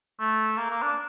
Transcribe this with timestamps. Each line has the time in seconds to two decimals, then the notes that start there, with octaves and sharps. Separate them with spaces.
0.20 A3
0.58 A#3
0.70 A#3
0.82 D4